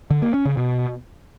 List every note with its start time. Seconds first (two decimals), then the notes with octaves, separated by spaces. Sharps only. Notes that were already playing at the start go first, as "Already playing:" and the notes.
0.11 D3
0.22 A#3
0.34 C#4
0.45 C#3
0.57 B2